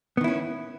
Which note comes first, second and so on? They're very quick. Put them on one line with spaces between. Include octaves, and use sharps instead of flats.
B3 D#3 E4 C#4